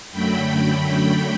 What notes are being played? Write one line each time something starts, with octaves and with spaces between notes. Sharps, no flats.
F#2 D3 F#3 A3 G5 B5
G5 B5